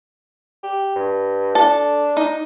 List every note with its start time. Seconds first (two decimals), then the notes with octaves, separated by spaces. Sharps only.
0.63 G4
0.96 G2
1.55 D4 A4 A5
2.17 D#4